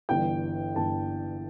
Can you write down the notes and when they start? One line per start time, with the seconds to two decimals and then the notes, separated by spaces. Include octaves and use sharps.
0.09 G1 G2 E3 G5
0.75 G1 G2 E3 A5